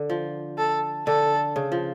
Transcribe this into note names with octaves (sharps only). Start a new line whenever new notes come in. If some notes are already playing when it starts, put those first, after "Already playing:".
Already playing: D3
F3
A4
D3 A4
C#3
F3